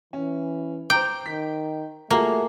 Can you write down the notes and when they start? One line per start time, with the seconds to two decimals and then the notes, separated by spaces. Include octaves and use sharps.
0.13 E3 C#4
0.90 C5 G5 A#5 D6
1.26 D#3 B6
2.11 A3 A#3 F4 F#4 G#4